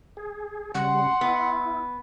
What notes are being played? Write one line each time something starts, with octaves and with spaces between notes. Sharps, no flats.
G#4
C#3 G3 F#5 C6
B3 E4